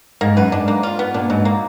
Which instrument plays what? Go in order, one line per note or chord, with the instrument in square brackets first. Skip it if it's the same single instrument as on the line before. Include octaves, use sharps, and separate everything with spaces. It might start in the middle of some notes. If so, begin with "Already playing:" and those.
[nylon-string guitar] G#2 [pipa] A#3
[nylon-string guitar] F#2 [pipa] B4
[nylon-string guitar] G#2 [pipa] D4
[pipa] A#3
F4
B3
[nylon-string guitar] A#2 [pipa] D4
[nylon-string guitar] G#2 [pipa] F#3
[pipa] A#3